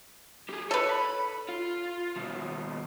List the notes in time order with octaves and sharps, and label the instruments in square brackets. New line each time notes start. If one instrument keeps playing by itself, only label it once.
[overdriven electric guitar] G4 G#4
[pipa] A4 B4 [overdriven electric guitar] C#5
[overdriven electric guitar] B5
F4
D#2 B2